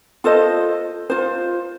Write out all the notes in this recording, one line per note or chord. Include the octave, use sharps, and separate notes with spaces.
F4 A4 C5 D#5
F4 C5